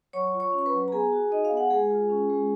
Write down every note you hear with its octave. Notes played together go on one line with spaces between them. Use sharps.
F#3 C#5 C#6
F4
C#5 C#6
C#4
C#6
B4 B5
F#3
A#5
B3 G#4 G#5
F#4
D#4 D#5
F5
B3
F#5
G#3 G#4 G#5
F4
C#4
G#3